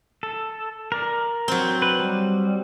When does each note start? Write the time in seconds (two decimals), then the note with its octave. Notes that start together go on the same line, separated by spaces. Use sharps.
0.23 A4
0.92 A#4 D5
1.48 F#3 C4
1.82 B4
2.00 G3